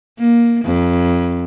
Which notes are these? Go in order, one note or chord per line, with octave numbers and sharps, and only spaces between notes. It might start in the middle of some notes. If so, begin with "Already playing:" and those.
A#3
F2